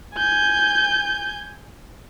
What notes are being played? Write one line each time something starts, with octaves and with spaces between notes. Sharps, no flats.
G#5 G6